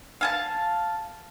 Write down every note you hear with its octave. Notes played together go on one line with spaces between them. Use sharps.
F5 G#5 A5